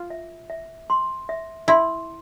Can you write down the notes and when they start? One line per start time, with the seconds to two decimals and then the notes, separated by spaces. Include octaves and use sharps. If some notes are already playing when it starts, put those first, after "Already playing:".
Already playing: F4
0.10 E5
0.50 E5
0.90 C6
1.29 E5
1.68 E4 C6